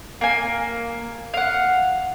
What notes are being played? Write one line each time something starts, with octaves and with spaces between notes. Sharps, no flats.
A#3 G#5
F5 F#5